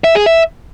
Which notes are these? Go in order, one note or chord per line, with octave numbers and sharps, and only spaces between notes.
E5
G#4
E5